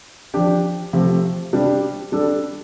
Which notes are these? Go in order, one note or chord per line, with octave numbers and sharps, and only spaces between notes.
F3 D4 G4
C3 F3 A3
C3 G3 D4 G4
G3 D4 A4